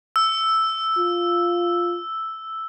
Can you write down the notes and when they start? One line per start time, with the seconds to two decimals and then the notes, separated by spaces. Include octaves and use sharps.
0.16 E6
0.98 F4